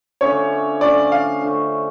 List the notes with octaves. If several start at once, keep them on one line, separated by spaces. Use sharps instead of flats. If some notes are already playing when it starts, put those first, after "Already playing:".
D3 F3 A3 C#4 C#5
D3 F3 A3 C#4 D5
F5
D3 F3 A3 C#4